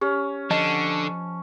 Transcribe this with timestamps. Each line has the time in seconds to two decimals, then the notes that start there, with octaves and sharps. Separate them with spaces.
0.01 C#4 G4
0.51 D3 F3 D#5 A5